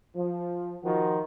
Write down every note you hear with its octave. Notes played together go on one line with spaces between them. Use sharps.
F3
D#3 F3 F4 F#4